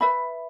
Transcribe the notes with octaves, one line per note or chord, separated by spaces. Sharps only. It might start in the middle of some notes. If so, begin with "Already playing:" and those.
B4 E5 B5